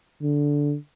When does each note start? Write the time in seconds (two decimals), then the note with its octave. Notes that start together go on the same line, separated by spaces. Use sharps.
0.22 D3